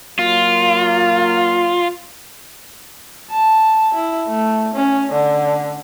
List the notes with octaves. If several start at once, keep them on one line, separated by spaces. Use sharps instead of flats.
F#3 A#3 F4
A5
E4
A3
C#4
D3